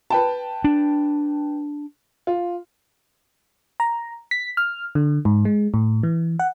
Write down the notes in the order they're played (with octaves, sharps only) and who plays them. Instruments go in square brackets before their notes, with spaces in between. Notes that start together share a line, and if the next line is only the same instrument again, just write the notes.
[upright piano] B4 G5 A5
[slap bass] D4
[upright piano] F4
[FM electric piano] A#5
B6
F6
D3
G#2
G#3
A2
E3
F#5